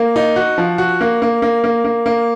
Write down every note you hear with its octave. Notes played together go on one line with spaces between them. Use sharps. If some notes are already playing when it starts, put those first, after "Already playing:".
Already playing: A#3
D#4
F#4
F3
F#4
A#3
A#3
A#3
A#3
A#3
A#3